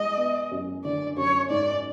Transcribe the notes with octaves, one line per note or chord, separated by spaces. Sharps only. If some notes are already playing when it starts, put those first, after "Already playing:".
Already playing: G#3 D#5
B3
F#2
D3 D5
F#2 C#5
G#2 D5